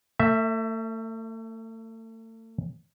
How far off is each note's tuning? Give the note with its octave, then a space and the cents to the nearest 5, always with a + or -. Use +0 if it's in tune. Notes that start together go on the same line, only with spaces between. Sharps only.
A3 +35 E5 +0